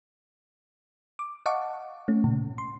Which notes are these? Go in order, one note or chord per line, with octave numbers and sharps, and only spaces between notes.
D6
D#5 F5 F#5 A5 C#6 D6
A3 C#4
A#2 C#3
C6